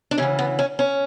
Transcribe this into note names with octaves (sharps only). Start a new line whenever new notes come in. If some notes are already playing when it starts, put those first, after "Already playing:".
D4
D2 C#3 E3 C#4
B3
C#4
C#4